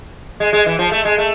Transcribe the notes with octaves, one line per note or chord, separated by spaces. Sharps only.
G#3
G#3
E3
F3
A3
G#3
A3